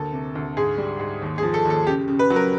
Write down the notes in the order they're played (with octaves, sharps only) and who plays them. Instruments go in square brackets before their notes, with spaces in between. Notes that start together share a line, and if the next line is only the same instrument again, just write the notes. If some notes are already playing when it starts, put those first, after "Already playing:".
Already playing: [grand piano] D2 A#3 A4
C3
D2
G#2 G#4
G3
G#2
D#2
G#4
F3
A4
D#2 A4
C#3 G4
C#3
B4
F#3
A#4